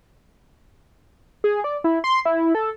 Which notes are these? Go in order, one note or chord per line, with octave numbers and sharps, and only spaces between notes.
G#4
D5
E4
C6
E4
A4